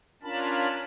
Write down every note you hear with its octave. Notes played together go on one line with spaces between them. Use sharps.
C#4 D4 F4 A#4 A5 B5